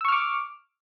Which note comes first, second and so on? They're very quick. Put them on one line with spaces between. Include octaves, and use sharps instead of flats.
E6 C#6 F6 D6